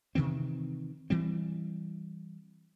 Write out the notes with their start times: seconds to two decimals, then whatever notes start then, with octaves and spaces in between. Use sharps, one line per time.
0.15 C3 D#3 E3 C4
1.10 E3 G3 C4